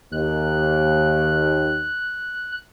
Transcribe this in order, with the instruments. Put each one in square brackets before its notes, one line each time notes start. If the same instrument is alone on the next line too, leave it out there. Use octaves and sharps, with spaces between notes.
[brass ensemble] D#2 [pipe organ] F#6